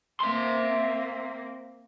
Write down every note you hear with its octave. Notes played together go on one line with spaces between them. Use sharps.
A#3 C4 E5 C6